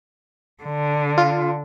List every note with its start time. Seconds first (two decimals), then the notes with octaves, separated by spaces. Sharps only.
0.64 D3
1.18 F4